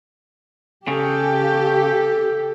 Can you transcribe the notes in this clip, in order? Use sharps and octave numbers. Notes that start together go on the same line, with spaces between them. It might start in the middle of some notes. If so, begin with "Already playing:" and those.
C#3 G4 A4